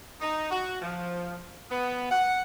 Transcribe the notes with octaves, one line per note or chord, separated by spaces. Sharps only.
D#4
F#4
F3
B3
F#5